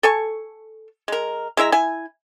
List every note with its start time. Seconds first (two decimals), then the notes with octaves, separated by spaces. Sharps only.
0.03 A4 G#5 C#6
1.08 G#3 A#4
1.57 G#3 E4 E5 A#5
1.72 E4 G#5